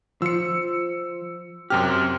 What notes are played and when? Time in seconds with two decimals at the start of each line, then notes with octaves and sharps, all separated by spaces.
0.22 F3 E6 C#7
1.70 F#2 C3 G4 F6